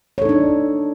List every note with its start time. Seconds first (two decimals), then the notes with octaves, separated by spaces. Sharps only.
0.18 C#5
0.22 A4
0.25 D#4
0.29 D4